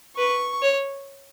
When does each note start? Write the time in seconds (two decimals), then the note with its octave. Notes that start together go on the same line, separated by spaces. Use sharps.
0.17 B4 C#6
0.62 C#5